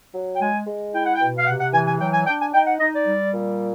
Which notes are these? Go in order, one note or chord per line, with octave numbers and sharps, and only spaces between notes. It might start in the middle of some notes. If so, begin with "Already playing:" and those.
F#3
G5
G#3 G#5
G#3
E4 G5
F#5
G5
B2
F5
C3 F#5
F#5
E3 G#5
G#5
F#3 G5
G#5
D4 G5
G#5
D#4 G5
F#5
D#4 D#5
D5
G3
A#2